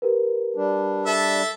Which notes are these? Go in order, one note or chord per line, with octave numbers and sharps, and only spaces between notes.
G4 A#4 B4
G3 D4
A4 E5